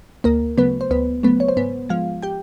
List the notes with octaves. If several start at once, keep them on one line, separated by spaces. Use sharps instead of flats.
D2 A#3 A#4
C#3 F#3 A3 B3 B4
C5
D2 B3 B4
C#3 F#3 A3 B3 B4
C#5
C5
G#2 B3 B4
F3 G#3 F4 F5
G4 G5